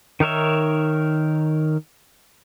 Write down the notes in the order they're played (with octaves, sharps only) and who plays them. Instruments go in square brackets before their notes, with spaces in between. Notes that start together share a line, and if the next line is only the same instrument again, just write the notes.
[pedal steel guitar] D#3 D#4 A#4 C#5 E5